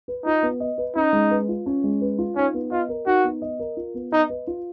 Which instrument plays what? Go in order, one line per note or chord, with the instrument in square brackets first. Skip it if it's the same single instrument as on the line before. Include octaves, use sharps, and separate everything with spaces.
[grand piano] B4
[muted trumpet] D#4 [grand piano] F4
[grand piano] B3
D#5
B4
[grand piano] C#4 [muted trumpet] D#4
[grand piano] G#3
B4
F4
C#4
G#3
B4
F4
[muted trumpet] C#4 [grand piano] D#4
[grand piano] B3
[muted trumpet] F4 [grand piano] D#5
[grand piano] A#4
[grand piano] D#4 [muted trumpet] F#4
[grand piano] B3
D#5
A#4
F4
B3
[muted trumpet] D#4 [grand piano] D#5
[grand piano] B4
F4